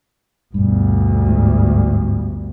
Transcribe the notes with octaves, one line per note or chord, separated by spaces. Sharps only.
G1 D2 G2 B2
G#2